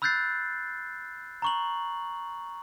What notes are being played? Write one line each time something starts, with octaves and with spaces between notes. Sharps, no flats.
B5 E6 F#6 G6 A6 C7
A#5 C#6 F#7